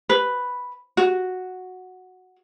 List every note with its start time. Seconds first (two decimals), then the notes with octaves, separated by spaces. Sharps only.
0.09 B4
0.97 F#4